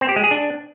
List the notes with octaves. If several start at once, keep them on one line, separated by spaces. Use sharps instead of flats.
C4
G4
G#3
G#4
D4